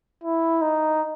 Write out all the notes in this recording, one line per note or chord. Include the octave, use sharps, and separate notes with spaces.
E4
D#4